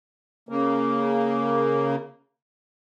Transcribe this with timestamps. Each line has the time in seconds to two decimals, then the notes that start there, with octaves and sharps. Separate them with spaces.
0.49 C#3 A#3